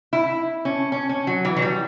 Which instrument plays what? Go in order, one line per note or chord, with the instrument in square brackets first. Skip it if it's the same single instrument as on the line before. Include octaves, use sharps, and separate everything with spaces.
[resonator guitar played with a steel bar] E4
C#4
C#4
C#4
F#3
E3
F#3
G3